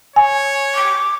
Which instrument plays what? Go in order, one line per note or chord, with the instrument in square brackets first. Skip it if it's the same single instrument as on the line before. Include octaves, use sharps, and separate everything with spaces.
[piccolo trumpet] C#5 [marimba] G#5
[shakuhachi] D6